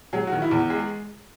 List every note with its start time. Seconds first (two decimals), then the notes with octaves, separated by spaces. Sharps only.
0.13 F#3 G#4
0.27 D#3 F#4
0.42 E4
0.51 E2
0.70 G#3 G#4